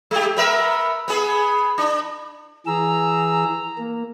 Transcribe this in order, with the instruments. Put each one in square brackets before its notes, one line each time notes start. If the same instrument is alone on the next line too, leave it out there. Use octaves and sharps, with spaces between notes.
[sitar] G#3 G4
B3 A#4 E5
B3 G#4
D4
[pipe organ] E3 G#4 E6 [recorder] A#5
[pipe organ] A#3